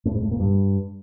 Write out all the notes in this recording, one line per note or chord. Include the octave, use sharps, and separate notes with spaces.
A2
G#2
A2
A#2
G2